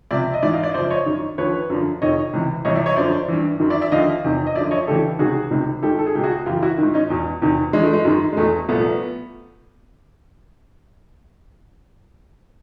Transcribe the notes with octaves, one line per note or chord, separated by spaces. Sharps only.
C#2 C3 F3 D5 E5
D#5
G#2 E3 D5 E5
D#5 F5
D5 E5
F#2 C#3 F3 C5 D5
C#5 D#5
F#2 D#3
D#2 D3 F3 B4 C#5
F#2 D3 F3
F2 C3 D#3 C#5 D#5
C#2 C3 E3
C2 C3 E3 C#5 D#5
D5 E5
C#5 D#5
F#2 D3 F3 C5 D5
G2 E3
F#2 D#3
D5 E5
D5 E5
D#2 D3 F3 D#5 F5
E2 C3 D#3
D#5
F#2 D3 F3 D5 E5
C#5 D#5
D2 C#3 E3 G4 A4
C#2 C3 D#3 F#4 G#4
C#2 C3 D#3
G#2 D#3 G4 A4
A4
G#4
C#2 B2 G4
F#4 G#4
F#2 C#3 E3 F4 G4
E4 F#4
G#2 D#3
C#4 D#4
E2 B2
E2 C3 D#3
G2 E3 G#3
A3
G#3
F#2 D#3
G#3
E2 B2 A3
C2 A#2 F3 A3 B3